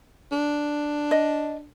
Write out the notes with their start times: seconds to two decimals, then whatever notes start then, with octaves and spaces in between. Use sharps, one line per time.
0.32 D4
1.11 D#5